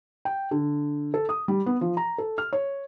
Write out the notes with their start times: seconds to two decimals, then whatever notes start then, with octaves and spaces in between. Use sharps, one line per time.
0.25 G5
0.51 D3
1.14 A4
1.29 D#6
1.48 G3
1.66 B3
1.81 F3
1.97 A#5
2.18 A4
2.38 F6
2.53 C#5